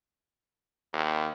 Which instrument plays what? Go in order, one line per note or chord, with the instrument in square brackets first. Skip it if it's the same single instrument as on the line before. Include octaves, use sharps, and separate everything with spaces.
[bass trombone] D#2